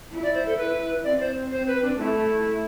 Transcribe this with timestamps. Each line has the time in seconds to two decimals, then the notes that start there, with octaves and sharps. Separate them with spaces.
0.12 E4
0.23 D5
0.34 C5
0.46 A4
0.58 B4
1.04 C4 D5
1.20 C5
1.51 C5
1.67 B4
1.82 D4
1.99 A3 E4